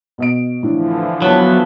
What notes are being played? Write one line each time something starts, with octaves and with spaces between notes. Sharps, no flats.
B2 D#5 D7
A2 D3 E3 F3 D4
F#3 B3 C#5 A5